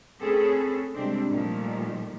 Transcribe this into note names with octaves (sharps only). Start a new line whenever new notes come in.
A3 C4 C#4 G#4 A4 B4
C3 G3 G#3 C4 D4
A#2 D#3 F3 G3 A3